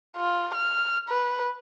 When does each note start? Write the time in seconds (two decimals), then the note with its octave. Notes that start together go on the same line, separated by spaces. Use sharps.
0.17 F4
0.55 F6
1.09 B4